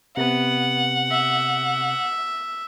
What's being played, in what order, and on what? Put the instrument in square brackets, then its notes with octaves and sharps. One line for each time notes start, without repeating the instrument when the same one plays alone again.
[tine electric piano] C3 [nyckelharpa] B3 [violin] F#5
[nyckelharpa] E5